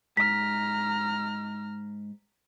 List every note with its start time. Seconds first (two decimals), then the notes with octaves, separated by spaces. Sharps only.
0.17 G#2 A#5 F6 B6